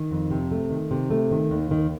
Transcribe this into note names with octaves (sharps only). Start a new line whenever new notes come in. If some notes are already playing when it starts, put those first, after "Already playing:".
Already playing: D#3
F2
C3
A3
D#3
C3
A3
D#3
D#2
D#3